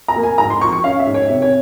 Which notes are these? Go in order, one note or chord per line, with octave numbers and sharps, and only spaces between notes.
A#5
A#3
G#5
G#2 A#5
C6
F3 C#6
C#6
C#4 F5
E5
G#2
C#5
C3 E5
C#5